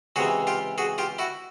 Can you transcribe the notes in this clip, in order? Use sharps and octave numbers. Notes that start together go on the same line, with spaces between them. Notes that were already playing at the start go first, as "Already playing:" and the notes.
C#2 C3 E3 F#4 G#4
F4 G4
F#4 G#4
F4 G4
E4 F#4